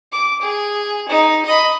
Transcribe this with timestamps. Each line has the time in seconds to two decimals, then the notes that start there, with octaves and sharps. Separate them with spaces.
0.12 D6
0.41 G#4
1.09 D#4
1.45 D#5 B5